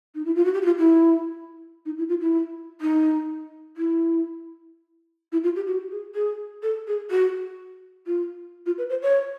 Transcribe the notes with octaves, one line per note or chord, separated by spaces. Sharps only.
D#4
E4
F4
F#4
G4
F#4
F4
E4
D#4
E4
F4
E4
D#4
E4
E4
F4
G4
F#4
G#4
G#4
A4
G#4
F#4
F4
F4
B4
C5
C#5